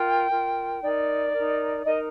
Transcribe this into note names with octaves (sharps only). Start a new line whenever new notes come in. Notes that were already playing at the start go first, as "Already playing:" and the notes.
Already playing: F4 A#4 G5
F4 A#4
D#4 A#4 D5
D#4 A#4
D#4 A#4 D#5